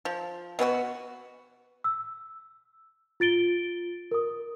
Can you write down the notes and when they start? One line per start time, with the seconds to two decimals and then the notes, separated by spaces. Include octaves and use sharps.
0.05 F3
0.59 B2 B3 C4 F#4
1.84 E6
3.20 F4 A6 D7 G7
4.11 A#4 D#6